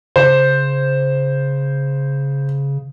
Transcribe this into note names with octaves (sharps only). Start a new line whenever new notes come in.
C#3 C5